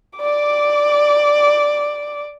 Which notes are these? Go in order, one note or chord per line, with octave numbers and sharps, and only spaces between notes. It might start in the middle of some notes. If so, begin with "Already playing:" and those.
D5 D6